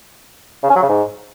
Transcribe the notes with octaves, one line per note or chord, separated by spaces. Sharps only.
C#3
C#4
F#3
C#3
G#2